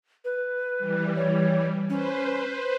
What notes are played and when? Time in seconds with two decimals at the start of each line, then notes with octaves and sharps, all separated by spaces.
0.25 B4
0.79 E3 G3
1.16 C#5
1.89 C#4 B4 C5